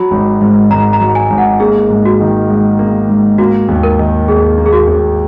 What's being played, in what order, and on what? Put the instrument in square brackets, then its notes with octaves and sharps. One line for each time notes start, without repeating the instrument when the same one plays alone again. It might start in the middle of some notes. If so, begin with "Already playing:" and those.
Already playing: [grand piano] F#3 [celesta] B5
[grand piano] G#1
G#2
[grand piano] G#1 [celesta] A#5
[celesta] A#5
[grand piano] F#3
[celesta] G#5
[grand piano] G#1
[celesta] F#5
[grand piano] A#3 [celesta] G#4
[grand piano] G#2
[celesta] F#4
[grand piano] D#3
G#2
A#3
G#2
[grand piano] A#3 [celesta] F#4
[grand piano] D#2
[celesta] A#4
[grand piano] D#3
[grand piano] D#2 [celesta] G#4
[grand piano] A#3
[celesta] G#4
F#4
[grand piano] D#2